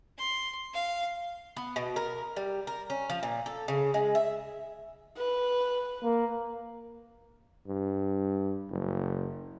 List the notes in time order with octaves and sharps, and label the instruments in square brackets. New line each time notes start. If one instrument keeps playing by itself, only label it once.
[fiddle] C6
F5
[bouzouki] B3
B2
A#4
G3
A#4
C#4
F3
A#2
A4
C#3
G#3
E5
[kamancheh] B4
[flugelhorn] A#3
[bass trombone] G2
F#1